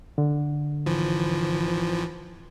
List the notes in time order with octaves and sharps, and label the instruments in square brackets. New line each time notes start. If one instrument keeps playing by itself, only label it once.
[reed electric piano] D3
[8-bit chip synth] G#1 E3 F3